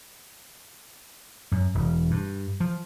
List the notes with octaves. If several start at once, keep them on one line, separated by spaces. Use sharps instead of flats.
F#2
E1
G2
F3